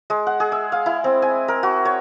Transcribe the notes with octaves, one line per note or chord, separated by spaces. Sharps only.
G#3
F#5
G#4
E5
F5
E4
C4
G#5
A#4
F#4
C#5